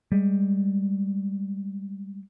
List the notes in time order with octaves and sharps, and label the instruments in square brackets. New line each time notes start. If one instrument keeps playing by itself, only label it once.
[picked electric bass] G3 G#3